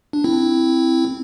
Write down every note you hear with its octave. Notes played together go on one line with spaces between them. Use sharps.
D4
C4 E4